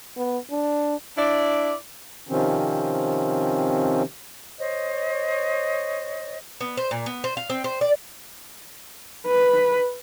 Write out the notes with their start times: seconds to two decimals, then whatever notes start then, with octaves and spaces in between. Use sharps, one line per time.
0.17 B3
0.51 D4
1.16 D4 E4 D5
2.29 C3 D#3 F3 C4 C#4
4.59 C5 C#5 D#5
6.61 B3
6.77 C5
6.91 A#2
7.06 B3
7.24 C5
7.37 F5
7.50 C4
7.64 C5
7.81 D5
9.27 B4